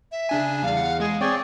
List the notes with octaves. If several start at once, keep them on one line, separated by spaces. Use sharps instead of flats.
E5
C#3 D4 G#5
E2 G3 F5
F#5
G#3 G#4
C4 G#4 C#5 D5 G5